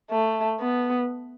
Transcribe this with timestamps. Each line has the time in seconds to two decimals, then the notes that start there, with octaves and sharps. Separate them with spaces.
0.10 A3
0.60 B3